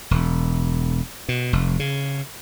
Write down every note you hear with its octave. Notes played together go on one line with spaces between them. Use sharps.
E1
B2
F1
C#3